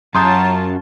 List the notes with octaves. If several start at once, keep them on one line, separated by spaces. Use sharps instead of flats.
F#2 F4 C#5 A5 A#5 C6 D#6 G6